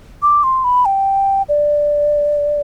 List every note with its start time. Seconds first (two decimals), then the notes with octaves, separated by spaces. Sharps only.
0.22 D6
0.43 C6
0.64 B5
0.85 G5
1.49 D5